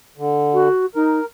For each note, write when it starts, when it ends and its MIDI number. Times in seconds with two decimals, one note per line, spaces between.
0.17 0.68 50
0.53 0.86 66
0.95 1.19 63
0.95 1.25 70